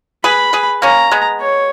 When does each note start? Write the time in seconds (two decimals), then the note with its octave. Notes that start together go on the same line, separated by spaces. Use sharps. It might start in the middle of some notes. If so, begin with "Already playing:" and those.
0.24 G#4 B4 B5
0.53 G#4 B4
0.82 A#3 C#4 A#5
1.11 G#3 B3
1.41 C#5